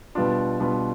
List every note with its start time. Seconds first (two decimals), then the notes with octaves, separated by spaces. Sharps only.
0.15 B2 G3 B3 D4 F4
0.60 B2 G3 B3 D4 F4